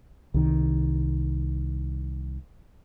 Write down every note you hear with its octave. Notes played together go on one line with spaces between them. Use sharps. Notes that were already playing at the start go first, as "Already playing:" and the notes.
C2 D#3